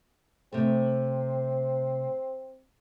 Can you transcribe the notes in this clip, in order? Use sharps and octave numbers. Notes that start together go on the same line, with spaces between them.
C3 A3 C4